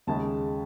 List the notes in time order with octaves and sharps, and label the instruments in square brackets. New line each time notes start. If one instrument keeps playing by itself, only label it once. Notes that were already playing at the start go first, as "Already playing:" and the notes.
[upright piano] D#2 C#3 G#3 A5